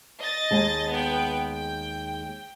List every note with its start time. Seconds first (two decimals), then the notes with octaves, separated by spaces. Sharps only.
0.22 D#5 A6
0.51 D#2 G#3 A5
0.90 B3 G5
1.54 G5